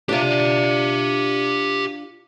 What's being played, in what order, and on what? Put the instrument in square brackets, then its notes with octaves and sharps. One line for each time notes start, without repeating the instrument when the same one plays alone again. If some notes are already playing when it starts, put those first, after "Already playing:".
[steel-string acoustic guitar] D4 F4 D5 [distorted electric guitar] G4 E5